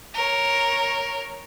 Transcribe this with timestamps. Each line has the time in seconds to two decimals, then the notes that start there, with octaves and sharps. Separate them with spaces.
0.14 A#4 C#5